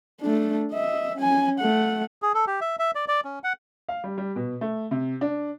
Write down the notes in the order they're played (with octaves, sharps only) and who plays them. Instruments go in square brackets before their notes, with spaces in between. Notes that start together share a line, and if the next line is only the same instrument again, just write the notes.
[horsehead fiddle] A3 D4
D#5 E5
C#4 G#5
A3 F#5
[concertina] G#4
A4
G4
E5
E5
D5
D5
C#4
F#5
[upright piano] F5
G3
G3
B2
A3
C3
D4